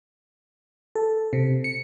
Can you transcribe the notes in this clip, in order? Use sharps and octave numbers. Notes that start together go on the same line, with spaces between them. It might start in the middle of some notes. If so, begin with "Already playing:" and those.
A4
C3
C#7